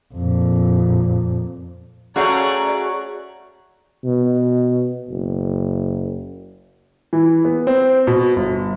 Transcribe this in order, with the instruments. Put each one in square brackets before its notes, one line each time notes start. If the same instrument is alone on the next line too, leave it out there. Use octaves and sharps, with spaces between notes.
[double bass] F2 A#2
[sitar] A3 C#4 G#4 [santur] F#4 C#5 F#5 [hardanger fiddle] D5 [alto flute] A#5
[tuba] B2
F#1
[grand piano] E3
B3
C4
B2
G1